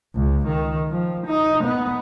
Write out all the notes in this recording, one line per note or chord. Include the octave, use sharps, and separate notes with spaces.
C#2
D#3
F3
D#4
B3